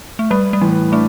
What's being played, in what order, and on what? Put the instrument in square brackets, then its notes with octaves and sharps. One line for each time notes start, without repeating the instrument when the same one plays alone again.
[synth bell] A3
[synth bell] G3 [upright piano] B4
[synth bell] G3
[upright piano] A2 [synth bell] E3
[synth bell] A3 [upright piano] D4